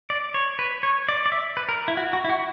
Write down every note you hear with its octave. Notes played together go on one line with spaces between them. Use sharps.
D5
C#5
B4
C#5
D5
D5
E5
B4
A#4
E4
F#4
F#4
E4
F#4